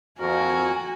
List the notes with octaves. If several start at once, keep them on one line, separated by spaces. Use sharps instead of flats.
F2 F#4 A#4 G#5